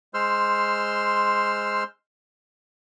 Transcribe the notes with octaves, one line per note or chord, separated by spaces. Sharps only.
G#3 C5 C6 E6 F6